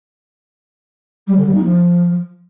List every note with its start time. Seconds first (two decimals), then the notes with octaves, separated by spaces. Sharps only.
1.27 G3
1.36 D3
1.45 G3
1.54 D#4
1.63 F3